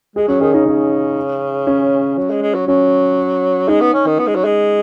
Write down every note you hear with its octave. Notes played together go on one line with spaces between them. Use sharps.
G#3 G#4
F#3 C#4
D#3 G#4
C#3 D#4
C#3 C#4
C#4
F#3
G#3
G#3
F#3
F#3 C#4
G#3 D#4
B3
C#4
D#3
B3
G#3
F#3
G#3